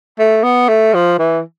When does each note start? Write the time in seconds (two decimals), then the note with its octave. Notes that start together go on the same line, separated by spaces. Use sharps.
0.19 A3
0.44 B3
0.68 A3
0.94 F3
1.19 E3